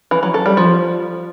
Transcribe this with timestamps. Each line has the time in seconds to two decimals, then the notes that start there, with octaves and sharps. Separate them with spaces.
0.11 E3
0.23 F#3
0.34 A4
0.46 G3
0.57 F3